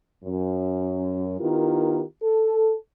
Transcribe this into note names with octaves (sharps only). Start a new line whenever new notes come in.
F#2
D#3 B3 E4 F4 G4 A#4
A4